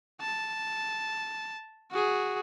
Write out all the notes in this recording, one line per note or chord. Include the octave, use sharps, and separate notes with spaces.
A5
F#4 G#4